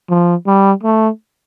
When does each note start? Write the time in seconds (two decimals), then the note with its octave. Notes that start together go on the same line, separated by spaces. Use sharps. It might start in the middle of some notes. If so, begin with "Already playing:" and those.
0.10 F3
0.47 G3
0.83 A3